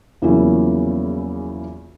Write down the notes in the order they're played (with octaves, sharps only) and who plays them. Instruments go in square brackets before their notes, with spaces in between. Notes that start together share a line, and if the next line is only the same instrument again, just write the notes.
[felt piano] E2 C#3 F3 F#3 A#3 E4